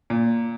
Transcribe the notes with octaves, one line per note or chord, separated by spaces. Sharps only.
A#2